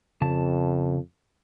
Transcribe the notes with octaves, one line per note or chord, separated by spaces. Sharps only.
F2 C#3 A5